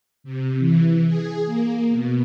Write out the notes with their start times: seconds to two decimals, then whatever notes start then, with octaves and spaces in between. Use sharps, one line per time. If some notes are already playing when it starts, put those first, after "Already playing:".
0.24 C3
0.59 E3
1.06 G#4
1.45 A#3
1.90 B2